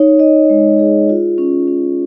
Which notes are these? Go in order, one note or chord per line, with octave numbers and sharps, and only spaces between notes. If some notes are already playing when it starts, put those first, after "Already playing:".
Already playing: D#4 C#5
D#5
G#3
G#4
F4
C#4
C#4